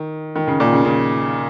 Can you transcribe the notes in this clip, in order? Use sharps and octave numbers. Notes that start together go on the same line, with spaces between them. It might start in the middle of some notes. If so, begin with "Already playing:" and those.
Already playing: D#3
D#3
C#3
A#2
C#3
C#3